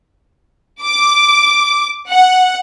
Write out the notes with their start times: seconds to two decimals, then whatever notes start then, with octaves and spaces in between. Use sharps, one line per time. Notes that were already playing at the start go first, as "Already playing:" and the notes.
0.83 D6
2.09 F#5